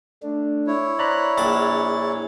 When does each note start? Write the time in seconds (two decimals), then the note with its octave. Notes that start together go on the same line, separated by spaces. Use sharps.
0.23 A3 D4
0.67 E4 C#5
0.99 C5 D5 A#5 B5 F#6
1.38 A#1 D4 G#4 D6 A6